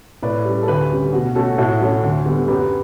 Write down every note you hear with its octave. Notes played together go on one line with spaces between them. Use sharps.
A2 B4 D5
G3 C#4
A4
D2 G4 B4
C#3 G3
B2 F#4
A3 C#4 F#4 A4
A2 F#4 A4
F#3 A3 C#4
D2
D3 G3 B3
F#2 G4 B4